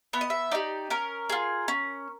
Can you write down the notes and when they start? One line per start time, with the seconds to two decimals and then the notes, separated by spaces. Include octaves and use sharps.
0.13 B3 E5
0.21 D#5
0.30 E5
0.52 D#4 G4 D5
0.90 C#4 A#4
1.30 F4 G#4
1.68 C#4